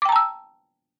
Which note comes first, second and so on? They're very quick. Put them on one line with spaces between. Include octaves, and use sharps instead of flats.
D6 G5 A#5 A5 E6